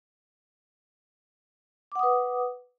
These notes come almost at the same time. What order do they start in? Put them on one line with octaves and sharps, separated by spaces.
D6 F#5 D#6 B4